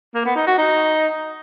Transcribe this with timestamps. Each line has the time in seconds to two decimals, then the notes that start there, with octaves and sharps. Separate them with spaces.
0.14 A#3
0.25 B3
0.36 D#4
0.47 F#4
0.58 D#4